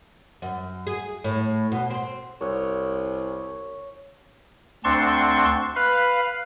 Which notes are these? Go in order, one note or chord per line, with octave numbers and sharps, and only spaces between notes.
F#2
G#4
A2
B2
C4
C2 C#5
D2 C4 D4 A5 C6 C#6
B4 F5 F#6